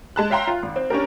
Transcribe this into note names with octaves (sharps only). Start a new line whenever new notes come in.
G#3 A5 F#6
C#5 E5 F5 G5 A#5 C6
F4
G#1
C4
C#4 D4 G4 A#4